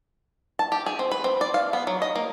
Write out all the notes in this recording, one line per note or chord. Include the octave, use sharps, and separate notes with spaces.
A5
G4
G#4
C4
B4
C4
D5
F5
B3
F#3
D#5
A#3